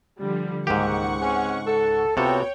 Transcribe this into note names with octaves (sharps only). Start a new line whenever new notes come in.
D3 F3 G3
C#2 G#2 D#3 G#3 A#3 G4 F#5 C#6
G#3 C4 C#4
A4
C3 B3 F4 F#4 A4 C#5 G5